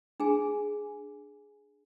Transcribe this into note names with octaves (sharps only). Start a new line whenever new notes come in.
D4 G#4 G#5